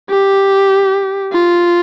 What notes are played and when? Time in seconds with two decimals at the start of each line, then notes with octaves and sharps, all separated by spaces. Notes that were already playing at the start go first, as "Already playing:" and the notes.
0.10 G4
1.33 F4